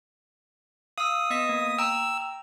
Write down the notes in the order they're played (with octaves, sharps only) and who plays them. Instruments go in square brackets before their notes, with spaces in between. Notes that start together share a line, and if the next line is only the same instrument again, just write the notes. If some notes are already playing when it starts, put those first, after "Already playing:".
[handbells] F5 E6 [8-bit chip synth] D#6
[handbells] B3 D#5 B6
A#3
[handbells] G5 A#5 [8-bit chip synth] E6